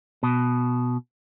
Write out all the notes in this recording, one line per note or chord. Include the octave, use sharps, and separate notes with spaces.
B2